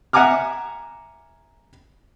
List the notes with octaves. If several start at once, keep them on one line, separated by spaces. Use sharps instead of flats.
E5 F#5 G#5 A#5 D6 F6